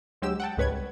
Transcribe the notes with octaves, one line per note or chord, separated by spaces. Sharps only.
D2 F#3 G#3 G4 E6
F#5 G5 A5
C#2 G#2 B4 C#5 G#6
C2